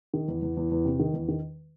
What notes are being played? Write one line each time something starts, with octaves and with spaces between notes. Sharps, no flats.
D#3
E2
E2
E2
E2
C3
D#3
E2
D#3